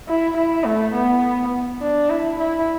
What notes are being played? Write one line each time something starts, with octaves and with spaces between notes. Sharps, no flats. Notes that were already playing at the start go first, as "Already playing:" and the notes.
E4
E4
A3
B3
D4
E4
E4